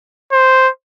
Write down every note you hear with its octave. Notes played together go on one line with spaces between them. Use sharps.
C5